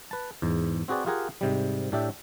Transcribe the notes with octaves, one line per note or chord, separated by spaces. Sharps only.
B4 A5
E2 G#2
C4 F#4 G#4 B4 D5
F4 G4 G#4 A#4 F#5 G#5
G#2 C3 G3
A2 D4 G4 D5 E5